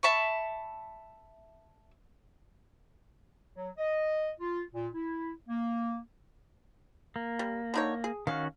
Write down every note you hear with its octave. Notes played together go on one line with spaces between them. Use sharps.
E5 A5 B5 C#6
F#3
D#5
F4
A#2
E4
A#3
A#3
G3
D3 D#4 C#5
G#4
D#3 C#4 F#4 F5